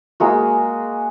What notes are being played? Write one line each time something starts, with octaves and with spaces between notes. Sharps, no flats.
G#3 A#3 F#4